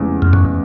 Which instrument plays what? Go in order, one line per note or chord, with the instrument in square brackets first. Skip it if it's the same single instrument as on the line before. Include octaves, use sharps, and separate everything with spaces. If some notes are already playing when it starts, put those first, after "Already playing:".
Already playing: [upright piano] F1 E2 C#3 G#3
[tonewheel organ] F2
F#2